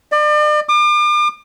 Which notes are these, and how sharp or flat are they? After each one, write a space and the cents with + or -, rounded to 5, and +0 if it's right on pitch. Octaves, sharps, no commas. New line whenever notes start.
D5 +40
D6 +40